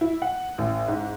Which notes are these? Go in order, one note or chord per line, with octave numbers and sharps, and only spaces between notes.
E4
F#5
A1
G#2